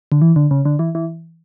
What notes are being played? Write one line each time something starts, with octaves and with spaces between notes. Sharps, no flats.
D3
E3
D3
C#3
D3
E3
E3